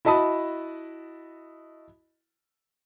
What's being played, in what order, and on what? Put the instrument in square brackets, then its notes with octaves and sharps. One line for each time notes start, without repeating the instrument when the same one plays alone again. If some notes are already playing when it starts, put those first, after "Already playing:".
[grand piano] E4 F#4 D#5 A5 B5 D#6